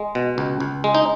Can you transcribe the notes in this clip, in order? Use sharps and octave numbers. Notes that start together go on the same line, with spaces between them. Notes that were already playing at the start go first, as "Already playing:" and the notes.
Already playing: G#3
B2
C#2
C#2
G#3
D#4